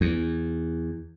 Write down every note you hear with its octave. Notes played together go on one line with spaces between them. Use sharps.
E2